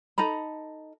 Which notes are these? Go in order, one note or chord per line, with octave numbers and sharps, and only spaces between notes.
D#4 A4 A#5 B5